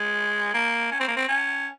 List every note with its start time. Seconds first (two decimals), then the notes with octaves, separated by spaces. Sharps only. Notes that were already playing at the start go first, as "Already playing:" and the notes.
Already playing: G#3
0.54 A#3
0.91 C#4
1.00 C4
1.08 A#3
1.16 C4
1.28 C#4